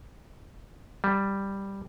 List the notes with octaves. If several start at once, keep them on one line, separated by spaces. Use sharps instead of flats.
G3